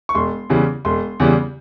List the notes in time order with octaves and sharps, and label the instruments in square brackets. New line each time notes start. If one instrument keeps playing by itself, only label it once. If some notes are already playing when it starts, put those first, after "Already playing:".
[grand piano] C#6
E1 C6
E2 C#3 E3 G3
E1 C6
E2 C#3 E3 G3